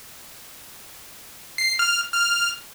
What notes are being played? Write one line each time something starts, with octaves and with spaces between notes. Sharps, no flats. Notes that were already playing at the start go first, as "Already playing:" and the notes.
C7
F6
F6